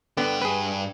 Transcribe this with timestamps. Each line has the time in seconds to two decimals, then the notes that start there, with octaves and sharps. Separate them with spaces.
0.17 G2 D3 B3 G5
0.42 G#4 B4